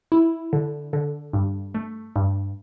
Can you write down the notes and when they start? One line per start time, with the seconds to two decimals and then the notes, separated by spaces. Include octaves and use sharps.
0.12 E4
0.53 D3
0.93 D3
1.33 G2
1.74 A3
2.16 G2